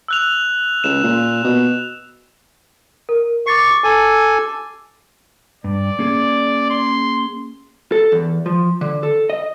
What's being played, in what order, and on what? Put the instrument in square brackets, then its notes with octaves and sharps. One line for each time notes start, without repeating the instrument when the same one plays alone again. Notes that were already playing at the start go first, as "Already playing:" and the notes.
[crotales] E6 F#6 F7
[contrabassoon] C#2 [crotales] E7
[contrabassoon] A#2
B2
[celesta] A#4
[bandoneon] C#6 [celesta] D6 A6 C7
[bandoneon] A4 G#5
[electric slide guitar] G2 [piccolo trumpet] D5
[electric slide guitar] A#3 C#4 G#4
[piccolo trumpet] C6
[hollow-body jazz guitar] A4
E2
F3
D3
A4
D#5